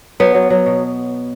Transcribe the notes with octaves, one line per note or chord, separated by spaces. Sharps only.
F#3 B3
F#3
F#3
B2